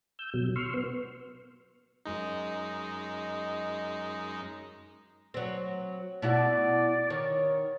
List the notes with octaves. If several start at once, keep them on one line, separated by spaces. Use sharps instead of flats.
E6 G6
B2 F#3
C6 C#6 E6 F6
B3
F#2 G#3 D#4
F#3 C4
B2 E4 F#4 D5
D#3 C#5